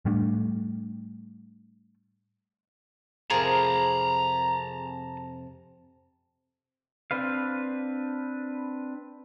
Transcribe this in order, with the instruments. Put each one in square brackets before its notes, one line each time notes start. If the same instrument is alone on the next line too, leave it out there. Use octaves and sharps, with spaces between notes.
[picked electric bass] A2 G3 A3 D4
[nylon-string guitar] F2 C3 [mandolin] F4 G#4 A#4 [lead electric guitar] A5 A#5
[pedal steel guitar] C4 D4 B4 F5